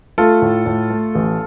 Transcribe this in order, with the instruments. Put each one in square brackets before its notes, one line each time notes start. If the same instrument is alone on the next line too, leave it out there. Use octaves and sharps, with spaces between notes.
[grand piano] A3 F4 A4
A2
A2
A3
A1